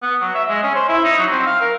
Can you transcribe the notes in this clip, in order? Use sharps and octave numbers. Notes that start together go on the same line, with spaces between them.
B3
F#3
E5
G#3
C#4
C5
E4
D#4
F#3
C4
F5
A#4